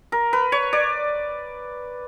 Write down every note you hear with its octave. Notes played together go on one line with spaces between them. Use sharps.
A#4
B4
C#5
D5